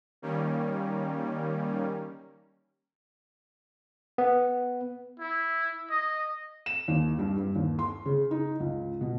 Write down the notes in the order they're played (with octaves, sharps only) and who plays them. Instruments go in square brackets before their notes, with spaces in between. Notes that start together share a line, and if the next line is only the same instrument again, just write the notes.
[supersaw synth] D#3 G3 A#3 C#4
[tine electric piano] B3
[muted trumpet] E4
D#5
[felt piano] E7
D#2
G2
G2
D#2
C6
C#3
D#4
C#2
B2